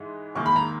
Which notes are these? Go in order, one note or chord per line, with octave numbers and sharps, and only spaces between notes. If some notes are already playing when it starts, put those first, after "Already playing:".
Already playing: G#2 E3 G#3 D#4
A#1 G#2 D#3 A#3 C#6
B5
A#5